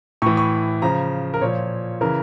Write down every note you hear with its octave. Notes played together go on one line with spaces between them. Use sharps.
A2 E3 C#6
C#6
C#3 F3 A#5
A#4
A#2 F3 C#5
C#3 E3 A#4